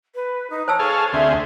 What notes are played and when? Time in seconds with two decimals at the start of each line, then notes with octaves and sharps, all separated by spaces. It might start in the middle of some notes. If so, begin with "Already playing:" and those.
0.15 B4
0.50 D#4
0.68 C5 C#5 A5 E6
0.79 G#4 A4 F5 C#6
1.13 D2 C4 G#4 E5